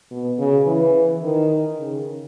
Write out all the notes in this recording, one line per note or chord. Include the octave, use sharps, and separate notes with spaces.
B2
C#3
E3
D#3
C#3